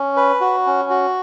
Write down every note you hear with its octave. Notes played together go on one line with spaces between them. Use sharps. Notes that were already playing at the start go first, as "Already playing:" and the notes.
Already playing: C#4
B4
F#4
C#4
F#4